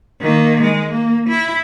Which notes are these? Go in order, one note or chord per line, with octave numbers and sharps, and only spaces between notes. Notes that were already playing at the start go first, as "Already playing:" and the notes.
D#3 A#3
G#3
A#3
E4